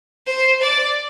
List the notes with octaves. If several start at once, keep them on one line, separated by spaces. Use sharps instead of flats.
C5
D5